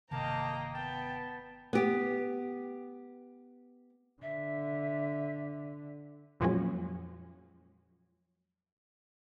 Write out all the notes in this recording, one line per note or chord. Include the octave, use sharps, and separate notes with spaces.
G1 C3 D#3 A#3 D#5 G5 A5 A#5
B3 G5 A5
B3 G4
D3 E5
F2 A#2 F3 F#3 G#3 C#4